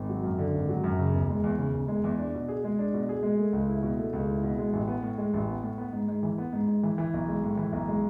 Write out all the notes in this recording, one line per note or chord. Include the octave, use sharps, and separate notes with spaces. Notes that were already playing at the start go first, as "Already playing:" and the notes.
Already playing: G#1
F#3
F#2
D3
G#1
F#3
F#2
C#3
E1
G#3
E2
C#3
E1
G#3
E2
D4
B2
G#4
G#3
D4
B2
G#4
G#3
A3
C#2
E4
B2
A3
C#2
E4
B2
G#3
A1
B3
A2
G#3
A1
B3
A2
B3
G#2
G#2
E3
B3
G#2
G#2
E3
E3
B1
G#3
A2
E3
B1
G#3